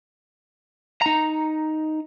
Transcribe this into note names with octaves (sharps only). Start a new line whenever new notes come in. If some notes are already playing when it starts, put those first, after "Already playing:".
D#4 A#5